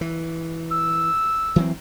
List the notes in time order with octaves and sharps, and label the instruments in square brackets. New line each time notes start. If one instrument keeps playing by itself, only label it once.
[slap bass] E3
[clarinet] E6
[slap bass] E3 F#3 C4